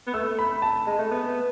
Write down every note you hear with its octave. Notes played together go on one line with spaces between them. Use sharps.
B3
A3 E6
B5
A5
G#3
A3
B3